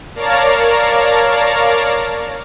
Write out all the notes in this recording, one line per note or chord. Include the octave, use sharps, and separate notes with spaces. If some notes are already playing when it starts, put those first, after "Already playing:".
A#4 C#5 D5 F5 A5 A#5